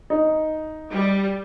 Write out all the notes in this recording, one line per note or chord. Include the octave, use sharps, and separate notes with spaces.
D#4
G3